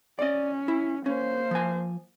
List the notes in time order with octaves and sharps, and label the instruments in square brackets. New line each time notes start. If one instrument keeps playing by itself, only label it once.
[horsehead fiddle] C#4 [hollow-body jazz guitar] D5 D#5
[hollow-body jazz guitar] E4
[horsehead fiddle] A#3 C5 [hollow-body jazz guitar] C#4
[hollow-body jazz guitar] F3 G#5